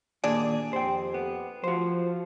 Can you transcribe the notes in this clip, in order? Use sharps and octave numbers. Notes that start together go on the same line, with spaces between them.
D#2 A#2 D4 G#4
F2 G4 C5 G5
B3
F3 F#4 C5